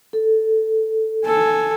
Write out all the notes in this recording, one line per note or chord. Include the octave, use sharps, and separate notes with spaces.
A4
A4 G#5